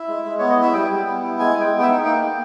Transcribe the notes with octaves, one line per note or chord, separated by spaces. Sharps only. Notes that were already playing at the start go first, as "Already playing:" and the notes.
Already playing: E4 E5
G#3
G#3
B3 C#5
D#5
E4
E5
G3 G5
G3
B3
E4
G#3 G#5
G#3 G5
B3
G5
E5
D#4
A#3 G5
A#3